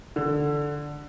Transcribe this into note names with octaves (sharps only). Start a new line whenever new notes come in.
D3